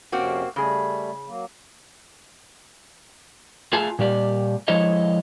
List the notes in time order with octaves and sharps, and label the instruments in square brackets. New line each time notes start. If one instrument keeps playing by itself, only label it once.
[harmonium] F2 C3 C#4 [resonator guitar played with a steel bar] A#3 C4 F#4
[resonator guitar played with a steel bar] C#3 G#4 [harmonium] G3 A3
[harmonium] F#3 A#3
[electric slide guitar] A3 F4 G#4 G#5 A5
A#2 G3 G4 D5
F3 G#3 E4 A4 C#5 D#5